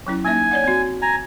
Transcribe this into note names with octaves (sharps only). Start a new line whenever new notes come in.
F#3 C#4 E4
A#3 D#4 E5 G#5
C#5 D5 F#5
C4 F#4
G#5 A#5